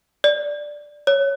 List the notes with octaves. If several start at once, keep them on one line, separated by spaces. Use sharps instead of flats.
D5
C#5